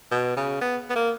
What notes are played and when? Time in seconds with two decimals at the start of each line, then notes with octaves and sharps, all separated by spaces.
0.11 B2
0.37 C#3
0.61 B3
0.90 B3
0.95 A#3